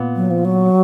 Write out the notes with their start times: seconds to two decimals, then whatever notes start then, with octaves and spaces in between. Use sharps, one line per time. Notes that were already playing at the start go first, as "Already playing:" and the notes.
Already playing: A#2 B3
0.16 F#3
0.30 F3
0.45 F#3